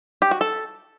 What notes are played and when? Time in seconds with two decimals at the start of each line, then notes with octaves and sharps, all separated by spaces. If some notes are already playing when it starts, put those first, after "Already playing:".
0.22 G4
0.31 F#4
0.41 A4